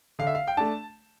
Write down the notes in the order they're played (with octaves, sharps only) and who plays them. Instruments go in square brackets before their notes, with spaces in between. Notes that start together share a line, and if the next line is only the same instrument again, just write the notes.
[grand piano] D3 F5
E5
F5
G5
A3 D4 A5